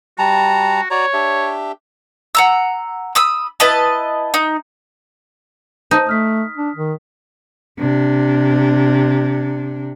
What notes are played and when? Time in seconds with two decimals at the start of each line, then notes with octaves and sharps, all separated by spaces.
0.19 G3 F#4 A5 A#5
0.91 F#4 C#5 D5 A#5
1.14 D4 G4 E5
2.35 F#5 A#5 E6
3.15 B5 D#6 E6
3.60 E4 B4 D#5 A5
4.34 D#4
5.91 D#4 C5 A5
6.07 A3 D#6 F6 B6
6.57 D4
6.76 D#3
7.79 C3 D4